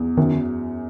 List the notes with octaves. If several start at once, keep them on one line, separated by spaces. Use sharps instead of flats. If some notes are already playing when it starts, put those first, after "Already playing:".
Already playing: E2
F#2 D#3